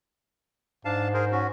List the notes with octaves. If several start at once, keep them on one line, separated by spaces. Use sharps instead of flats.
G#2 D4 F5 A5
G#4 A#4 C5
C#4 F#4